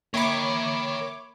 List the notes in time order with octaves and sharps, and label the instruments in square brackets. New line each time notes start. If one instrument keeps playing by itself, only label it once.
[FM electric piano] A#3 E5 B5 [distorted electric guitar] A#4 G5 [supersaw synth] C#5 D6